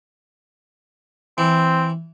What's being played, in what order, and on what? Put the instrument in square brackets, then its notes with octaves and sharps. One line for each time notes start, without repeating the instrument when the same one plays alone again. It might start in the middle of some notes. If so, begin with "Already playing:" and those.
[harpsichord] E3 [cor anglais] C4